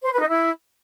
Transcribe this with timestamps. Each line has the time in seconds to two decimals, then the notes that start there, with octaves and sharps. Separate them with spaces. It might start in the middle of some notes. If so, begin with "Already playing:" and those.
0.04 C5
0.12 B4
0.21 D#4
0.29 E4